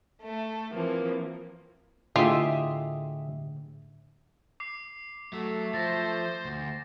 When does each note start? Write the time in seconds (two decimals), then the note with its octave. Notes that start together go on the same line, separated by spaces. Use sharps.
0.21 A3 A4
0.71 E3 F3 A#3 C4
2.16 A2 D3 F4 G4 G#4 D#5 E5
4.60 D6 C7
5.33 F#3 A3
5.74 F3 C5 A6 A#6
6.45 D2